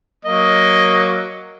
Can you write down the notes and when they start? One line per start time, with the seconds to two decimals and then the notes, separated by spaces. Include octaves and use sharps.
0.25 F#3 A#3 D#5